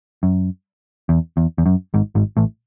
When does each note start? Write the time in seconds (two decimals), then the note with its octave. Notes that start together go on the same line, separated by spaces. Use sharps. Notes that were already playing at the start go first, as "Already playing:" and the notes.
0.23 F#2
1.09 E2
1.37 E2
1.58 E2
1.66 F#2
1.94 G#1 G#2
2.15 G#1 G#2
2.37 A1 A2